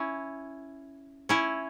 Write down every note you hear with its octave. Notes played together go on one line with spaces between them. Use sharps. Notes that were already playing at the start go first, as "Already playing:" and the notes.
Already playing: C#4 E4
C#4 E4